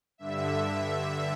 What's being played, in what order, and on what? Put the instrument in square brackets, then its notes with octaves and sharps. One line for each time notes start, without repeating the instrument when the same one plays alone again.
[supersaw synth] G2 D3 E5